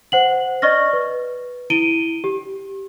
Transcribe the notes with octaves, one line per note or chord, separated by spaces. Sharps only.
C5 F#5 F#7
D5 D#5 C#6 F6 A#6
B4
E4 D7 D#7 G7
G4